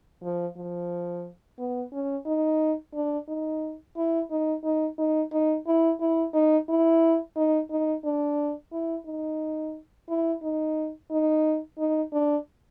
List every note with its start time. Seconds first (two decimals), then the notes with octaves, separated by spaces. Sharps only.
0.23 F3
0.57 F3
1.59 B3
1.93 C#4
2.26 D#4
2.95 D4
3.28 D#4
3.97 E4
4.31 D#4
4.64 D#4
4.99 D#4
5.32 D#4
5.67 E4
6.00 E4
6.34 D#4
6.69 E4
7.37 D#4
7.71 D#4
8.05 D4
8.72 E4
9.06 D#4
10.09 E4
10.43 D#4
11.11 D#4
11.78 D#4
12.13 D4